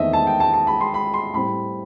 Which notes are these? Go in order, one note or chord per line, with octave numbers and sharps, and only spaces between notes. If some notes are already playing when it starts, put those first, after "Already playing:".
Already playing: E2 D#3 A3 C4 D#5 E5
A5
G5
A5
A5
B5
C6
B5
C6
A2 G3 C4 B5